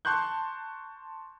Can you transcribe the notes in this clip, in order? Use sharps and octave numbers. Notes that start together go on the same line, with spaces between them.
A5 C6 C#6 F#6 G6